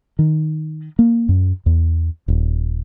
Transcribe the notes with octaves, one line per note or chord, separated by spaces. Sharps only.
D#3
A#3
F#2
E2
D#1